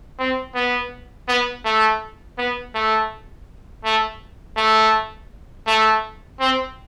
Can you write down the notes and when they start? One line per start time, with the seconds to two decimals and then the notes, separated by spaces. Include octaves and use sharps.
0.19 C4
0.55 B3
1.28 B3
1.65 A3
2.38 B3
2.74 A3
3.84 A3
4.57 A3
5.67 A3
6.40 C4